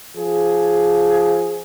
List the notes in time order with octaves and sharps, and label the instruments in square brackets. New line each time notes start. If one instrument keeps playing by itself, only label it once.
[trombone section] F3 G#4